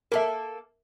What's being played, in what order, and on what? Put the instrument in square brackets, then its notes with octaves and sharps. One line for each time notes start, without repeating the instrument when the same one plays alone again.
[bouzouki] A#3 A4 [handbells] A#4 E5